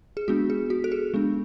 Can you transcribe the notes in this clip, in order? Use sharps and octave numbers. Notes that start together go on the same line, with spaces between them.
G#4
G#3 B3 D4 F#4
G#4
F#4
A4
G#4
G#3 B3 D4